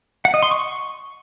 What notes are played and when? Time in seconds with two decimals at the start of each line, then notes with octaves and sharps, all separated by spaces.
0.25 F#5
0.34 D#5
0.43 C6
0.51 C#6